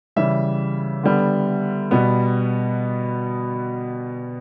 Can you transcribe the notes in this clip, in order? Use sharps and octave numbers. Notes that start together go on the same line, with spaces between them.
C#3 E3 G3 E5
D3 G3 B3
B2 G3 B3